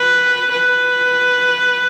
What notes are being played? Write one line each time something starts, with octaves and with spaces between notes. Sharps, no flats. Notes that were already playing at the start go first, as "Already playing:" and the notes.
Already playing: B4
B4